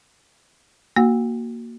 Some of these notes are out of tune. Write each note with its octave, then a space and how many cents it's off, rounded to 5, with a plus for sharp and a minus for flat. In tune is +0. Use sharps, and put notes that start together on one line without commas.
A#3 +0 F#4 +0 F#5 -15